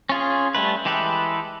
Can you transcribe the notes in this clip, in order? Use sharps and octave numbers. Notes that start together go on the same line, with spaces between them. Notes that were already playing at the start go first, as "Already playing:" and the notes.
C#4 F4 G#4
G3 A3 B4
E3 G#3 G4 A4 B4